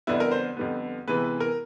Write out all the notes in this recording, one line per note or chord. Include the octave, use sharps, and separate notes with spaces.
F2 D3 G3 B3 E4
A#4
C5
F2 D3 G3 B3
C3 E3 G#3 B3 B4
B4
A#4